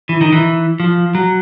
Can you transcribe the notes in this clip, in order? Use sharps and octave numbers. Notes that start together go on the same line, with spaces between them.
E3
D#3
E3
F3
F#3